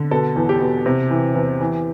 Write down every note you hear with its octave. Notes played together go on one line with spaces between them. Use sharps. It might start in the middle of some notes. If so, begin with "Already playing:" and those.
Already playing: D3
B2 A4
E2
G4
B2
C3
E3
E2
E3